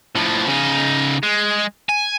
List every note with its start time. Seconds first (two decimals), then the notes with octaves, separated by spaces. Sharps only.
0.15 A2 F3
0.47 C#3 D#4
1.23 G#3
1.89 G#5